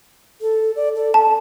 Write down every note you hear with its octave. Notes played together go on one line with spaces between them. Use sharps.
A4
D5
A4
A4 A5